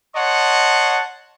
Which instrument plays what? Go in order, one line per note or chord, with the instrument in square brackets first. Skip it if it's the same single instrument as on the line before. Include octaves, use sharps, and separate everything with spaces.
[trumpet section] C#5 D#5 F#5 A5 C6